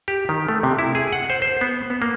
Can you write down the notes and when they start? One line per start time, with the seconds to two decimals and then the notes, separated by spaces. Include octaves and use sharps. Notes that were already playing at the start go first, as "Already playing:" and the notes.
0.08 G4
0.29 D#3
0.49 A3
0.63 C3
0.79 E4
0.95 G#4
1.13 F#5
1.30 C5
1.42 C5
1.61 B3
1.90 B3
2.02 A#3